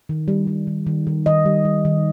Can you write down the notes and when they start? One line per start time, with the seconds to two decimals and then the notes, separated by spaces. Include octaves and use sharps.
0.09 D#3
0.28 G3
0.47 G3
0.67 D#3
0.87 D#3
1.07 D#3
1.26 D#3 D#5
1.46 G3
1.65 G3
1.85 D#3